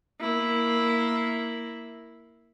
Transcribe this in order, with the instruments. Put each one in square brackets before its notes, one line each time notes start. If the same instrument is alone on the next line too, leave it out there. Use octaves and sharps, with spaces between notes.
[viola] A#3 E4